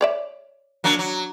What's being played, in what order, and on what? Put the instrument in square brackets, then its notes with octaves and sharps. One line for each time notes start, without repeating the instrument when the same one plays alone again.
[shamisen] C#5 D5 E5
[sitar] F#3 A#3 D4
F#3